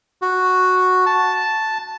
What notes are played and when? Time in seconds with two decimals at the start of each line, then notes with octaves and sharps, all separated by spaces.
0.22 F#4
1.06 A5